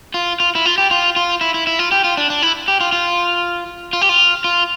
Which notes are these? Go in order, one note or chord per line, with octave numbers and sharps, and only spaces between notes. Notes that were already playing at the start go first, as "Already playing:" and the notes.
F4
F4
E4
F4
G4
F4
F4
E4
E4
E4
F4
G4
F4
D4
D4
E4
G4
F4
F4
F4
G4
F4
F4